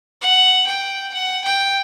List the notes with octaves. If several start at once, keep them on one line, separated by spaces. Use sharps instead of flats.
F#5
G5
F#5
G5